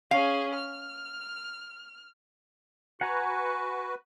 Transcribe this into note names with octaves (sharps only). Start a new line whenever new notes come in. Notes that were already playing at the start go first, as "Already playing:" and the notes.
C#4 G#4 F5
F6
F#4 B4 F#5 G#5 A#5